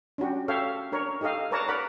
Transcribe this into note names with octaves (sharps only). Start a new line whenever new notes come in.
C#4 D4 F#4 G4
A4 C#5 E5 F5 G5
D4 A#4 C#5
D#4 G4 A4 D#5 F5
A#4 B4 C#5 D5 A5 A#5
A#4 D5 F#5 B5